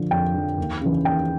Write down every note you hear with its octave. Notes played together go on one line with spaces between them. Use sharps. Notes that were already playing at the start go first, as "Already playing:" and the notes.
Already playing: D3 F3
F2 G5
D3 F3
D#2
C#3 E3
D#2 G5